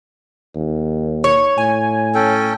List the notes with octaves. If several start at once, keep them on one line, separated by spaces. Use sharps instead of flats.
D#2
C#5 C#6
A2 G#5
C#4 A4 G5